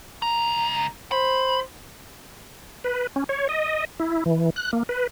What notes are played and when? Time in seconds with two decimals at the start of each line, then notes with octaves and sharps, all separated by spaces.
0.22 C#2 A#5
1.12 C5 B5
2.84 B4
3.16 C#4
3.29 C#5
3.49 D#5
4.00 E4
4.26 E3
4.56 F#6
4.73 A#3
4.89 B4